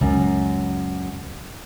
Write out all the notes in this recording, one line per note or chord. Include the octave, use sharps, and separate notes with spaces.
C#2 F#2